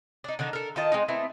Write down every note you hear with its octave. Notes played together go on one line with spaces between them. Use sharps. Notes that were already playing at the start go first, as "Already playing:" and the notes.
D4 D#4
D3 D#3 D4 D#4
A4 A#4
D#3 F4 D#5 A5
G#3 C4 D#4
A3 B3 C4 E4